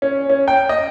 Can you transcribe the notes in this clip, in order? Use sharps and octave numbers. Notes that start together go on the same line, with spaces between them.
C#4
C#4
G5
D#5